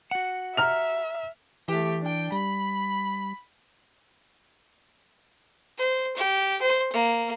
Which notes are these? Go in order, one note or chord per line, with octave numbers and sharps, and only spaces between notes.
F#4 F#5
E5 A#5 F6 F7
E3 A3 G4
D4 G5
G3 B5
C5
G4
C5
A#3